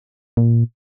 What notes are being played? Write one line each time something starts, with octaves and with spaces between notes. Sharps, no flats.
A#2